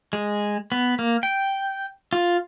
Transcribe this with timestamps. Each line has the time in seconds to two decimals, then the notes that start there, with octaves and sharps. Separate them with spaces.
0.13 G#3
0.72 B3
0.99 A#3
1.23 G5
2.13 F4